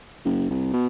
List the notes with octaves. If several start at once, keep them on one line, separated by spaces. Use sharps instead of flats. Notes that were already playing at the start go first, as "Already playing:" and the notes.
F#1
C2
B2